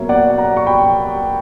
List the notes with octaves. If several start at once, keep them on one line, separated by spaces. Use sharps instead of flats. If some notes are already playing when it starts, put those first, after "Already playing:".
Already playing: B2 F#3 A#3 C#5 E5
D5 F#5
F#5 A#5
C#6
G5 B5